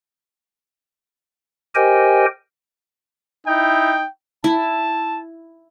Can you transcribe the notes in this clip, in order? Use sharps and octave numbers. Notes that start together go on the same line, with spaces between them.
G4 A#4 C5 D#5 G5 G#5
D#4 E4 G5
E4 A5